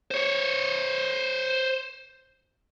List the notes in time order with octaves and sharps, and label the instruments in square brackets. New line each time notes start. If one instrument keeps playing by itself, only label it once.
[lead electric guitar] C5 C#5